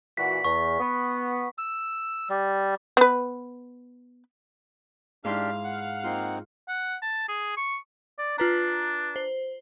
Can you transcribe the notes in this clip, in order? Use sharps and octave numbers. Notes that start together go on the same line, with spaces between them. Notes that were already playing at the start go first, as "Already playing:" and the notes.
A#2 E3 F#4 B6
E2 C#6
B3
E6
G3
B3 B4
G#2 D4 E4 G4 F5 C6
F#5
A#3 C4 D#4 F4
F#5
A5
G#4
C#6
D5
D4 F4 B4 A#5
C5